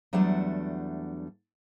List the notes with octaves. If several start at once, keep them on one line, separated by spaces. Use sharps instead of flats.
E2 F#3 G3 A3 D4 F#5